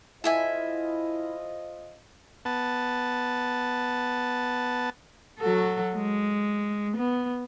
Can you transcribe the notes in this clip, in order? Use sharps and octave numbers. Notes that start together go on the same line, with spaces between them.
E4 F4 A4 C5 D#5 E5 G#5
B3 A5
F#3 F#4 A4
G#3
B3